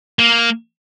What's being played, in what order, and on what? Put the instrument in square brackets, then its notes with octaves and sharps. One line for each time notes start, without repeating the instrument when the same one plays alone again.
[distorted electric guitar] A#3